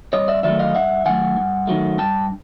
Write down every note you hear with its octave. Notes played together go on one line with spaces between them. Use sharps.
G2 C#5 D#5
D5 E5
D#3 F#3 A3 D5 E5
D#5 F5
G2 E5 F#5
D#3 F#3 A3 F#5 G#5
G2
D#3 F#3 A3
G2 G5 A5